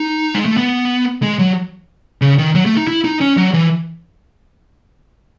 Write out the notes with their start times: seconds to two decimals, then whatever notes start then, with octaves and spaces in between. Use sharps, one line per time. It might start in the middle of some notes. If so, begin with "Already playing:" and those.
Already playing: D#4
0.35 G#3
0.46 A3
0.57 B3
1.23 G#3
1.39 F#3
2.22 C#3
2.38 D#3
2.55 F#3
2.66 A3
2.77 D#4
2.87 E4
3.05 D#4
3.21 C#4
3.37 F#3
3.54 E3